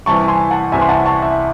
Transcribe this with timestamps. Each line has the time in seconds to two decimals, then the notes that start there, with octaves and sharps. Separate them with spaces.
0.06 C2 C3 E3 A5 C#6
0.28 G#5 C6
0.51 F#5 A5
0.72 C2 C3 E3 E5 G#5
0.81 C6
0.89 F#5 A5
1.05 A5 C#6
1.22 E5